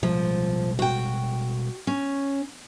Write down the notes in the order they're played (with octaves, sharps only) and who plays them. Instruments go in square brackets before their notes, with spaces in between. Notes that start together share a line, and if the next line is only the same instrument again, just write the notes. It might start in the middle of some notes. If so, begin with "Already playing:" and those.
[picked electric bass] B2 G3 G#3 [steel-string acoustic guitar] F3
[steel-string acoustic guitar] F#4 G5
C#4